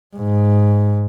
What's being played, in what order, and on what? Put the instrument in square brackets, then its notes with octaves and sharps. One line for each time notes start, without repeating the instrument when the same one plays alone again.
[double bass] G#2